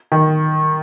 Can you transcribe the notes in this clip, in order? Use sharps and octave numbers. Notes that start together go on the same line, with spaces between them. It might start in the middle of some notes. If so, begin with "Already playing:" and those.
D#3